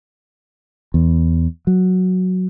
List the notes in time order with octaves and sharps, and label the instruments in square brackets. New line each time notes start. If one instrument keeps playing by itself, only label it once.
[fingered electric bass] E2
F#3